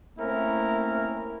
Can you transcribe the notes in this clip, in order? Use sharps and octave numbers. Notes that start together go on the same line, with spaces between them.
A3 A#3 C4 C#4 E4 A#4